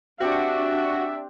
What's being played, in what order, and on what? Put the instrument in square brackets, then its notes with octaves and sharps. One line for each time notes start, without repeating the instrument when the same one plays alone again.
[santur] C4 G4 D6 [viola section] D4 [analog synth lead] F#4 [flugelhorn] E5